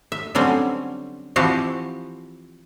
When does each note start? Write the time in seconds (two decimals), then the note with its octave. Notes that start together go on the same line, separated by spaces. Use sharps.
0.12 E5
0.35 D3 F#3 G3 C4 C#4
1.36 E3 F3 C4 F#4 G4